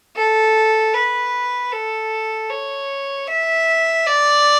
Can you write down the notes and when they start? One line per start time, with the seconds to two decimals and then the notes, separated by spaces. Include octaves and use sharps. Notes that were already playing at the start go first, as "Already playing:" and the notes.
0.16 A4
0.94 B4
1.72 A4
2.50 C#5
3.27 E5
4.06 D5